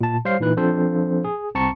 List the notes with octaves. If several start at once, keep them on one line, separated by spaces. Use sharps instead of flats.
A#2 A5
G3 C5 C#5 F5 C7
A#2 E3 D#4 B4 F#6
F3 C4 D4 A4 C5
G#4
C2 C4 A5 A#5 C#6 C#7